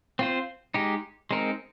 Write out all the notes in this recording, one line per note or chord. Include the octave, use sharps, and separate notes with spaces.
C4 F4 C5
G#3 D#4 G4
G#3 C4 D#4 A#4